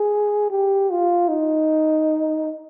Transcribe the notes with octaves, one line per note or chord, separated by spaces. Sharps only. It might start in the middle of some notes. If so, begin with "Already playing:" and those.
Already playing: G#4
G4
F4
D#4